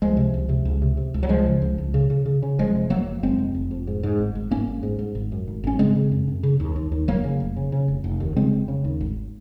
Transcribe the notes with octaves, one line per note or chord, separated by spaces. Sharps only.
C#2 F3 G#3
C3
C#2
C3
C#2
C3
C3
C#2
F#3
C#2 F3 G#3
C#3
C#2
C#2
C#3
C#3
C#3
C#3
F1 F3 G#3
C3
F1 F#3 A#3
F1
F1 G#3 C4
F1
F1
F2
G#2
G#2
G#1
G#1
G#2 A#3 C#4
G#1
G#2
G#2
G#1
F#2
G#1
G#1 C#4
C#3 G#3 C4
C#3
F#2
F#2
C#3
D#2
D#2
D#2
F1 F#3 A#3
C#3
F1
C#3
C#3
F1
F1
D#2
C#3 G#3 C4
F1
C#3
D#2
G#1